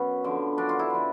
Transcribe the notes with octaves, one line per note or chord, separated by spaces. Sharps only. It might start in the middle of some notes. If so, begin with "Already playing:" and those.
Already playing: F#2 B3 C#4
D3 F3
F#2 D4
F4
E4
D3 F3